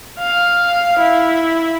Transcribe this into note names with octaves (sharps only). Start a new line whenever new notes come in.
F5
E4